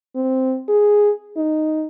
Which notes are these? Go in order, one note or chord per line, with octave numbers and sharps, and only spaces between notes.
C4
G#4
D#4